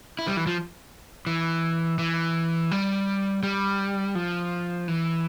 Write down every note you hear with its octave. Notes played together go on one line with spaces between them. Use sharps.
E4
G3
E3
F3
E3
E3
G3
G3
F3
E3